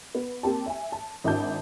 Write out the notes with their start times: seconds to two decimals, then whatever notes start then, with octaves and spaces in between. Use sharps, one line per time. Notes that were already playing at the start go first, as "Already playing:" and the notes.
0.15 B3
0.43 A#3 C4 G4 A5
0.66 E5 G#5
0.92 A5
1.24 G#1 D4 E4 F#4 A5 G6